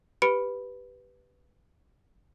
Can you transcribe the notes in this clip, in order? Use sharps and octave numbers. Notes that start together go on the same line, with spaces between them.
G4 B4 B5 C#7 D7